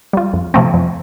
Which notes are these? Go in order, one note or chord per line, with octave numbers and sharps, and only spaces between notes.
G3 F4
F2
C3 F3 A3 C4
F2